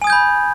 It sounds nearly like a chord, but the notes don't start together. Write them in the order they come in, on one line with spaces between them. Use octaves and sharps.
G#5 D#6 G#6 G6 B5